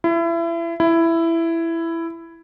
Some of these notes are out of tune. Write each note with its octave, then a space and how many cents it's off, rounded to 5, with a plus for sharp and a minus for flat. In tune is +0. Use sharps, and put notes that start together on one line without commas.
E4 +30
E4 +10